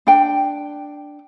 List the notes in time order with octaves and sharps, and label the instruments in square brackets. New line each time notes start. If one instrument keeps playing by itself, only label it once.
[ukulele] D4 G5